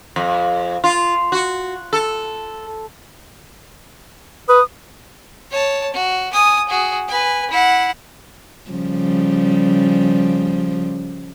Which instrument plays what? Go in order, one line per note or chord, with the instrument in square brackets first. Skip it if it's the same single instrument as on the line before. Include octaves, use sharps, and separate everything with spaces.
[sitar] F2
F4
F#4
A4
[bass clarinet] B4 [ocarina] D#6
[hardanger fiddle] C#5 A5
F#4
G#5 D#6
F#4 G#4
B4 G#5
E4 F#5
[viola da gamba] C#3 F3 G3